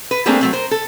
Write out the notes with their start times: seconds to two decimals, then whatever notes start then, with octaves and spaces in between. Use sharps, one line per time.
0.11 B4
0.26 G3 A3 A#3 C4 D4 G#4
0.41 F#3 A3 C4
0.53 A#4 C5
0.71 A4